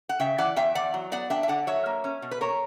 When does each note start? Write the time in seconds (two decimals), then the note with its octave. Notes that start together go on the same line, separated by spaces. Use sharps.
0.09 F#5
0.20 C#3 E5 G5
0.38 E3 D5 F#5
0.56 E2 E5 G5
0.75 E2 D5 F#5
0.94 F#3
1.12 B3 D5 F#5
1.30 D4 E5 G5
1.43 E5
1.48 D3 D5 F#5
1.67 F#3 C#5 E5
1.86 A#3
2.04 C#4
2.22 B2
2.31 B4
2.41 A#3 A#4 C#5